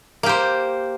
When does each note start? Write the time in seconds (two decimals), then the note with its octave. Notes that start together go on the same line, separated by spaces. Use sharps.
0.23 A#3
0.26 G4
0.29 C5